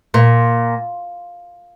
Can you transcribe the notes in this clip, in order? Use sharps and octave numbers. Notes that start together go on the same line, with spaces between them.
A#2